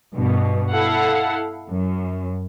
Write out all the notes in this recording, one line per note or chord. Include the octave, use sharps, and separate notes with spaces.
G2 B2
E4 A4 F5 F#5
F#2